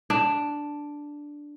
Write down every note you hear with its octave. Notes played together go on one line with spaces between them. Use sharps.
D4